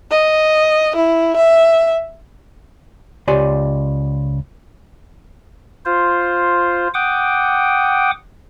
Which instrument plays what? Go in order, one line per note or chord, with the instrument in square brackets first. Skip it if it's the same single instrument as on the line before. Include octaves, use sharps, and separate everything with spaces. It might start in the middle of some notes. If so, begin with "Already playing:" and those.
[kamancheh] D#5
E4
E5
[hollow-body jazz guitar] C#2 G4 D5 G#5 C6
[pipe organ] F4 C5
F#5 G5 D6 D#6